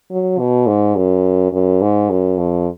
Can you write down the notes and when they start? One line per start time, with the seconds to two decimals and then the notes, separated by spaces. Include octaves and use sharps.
0.11 F#3
0.39 B2
0.67 G#2
0.96 F#2
1.52 F#2
1.81 G#2
2.10 F#2
2.38 F2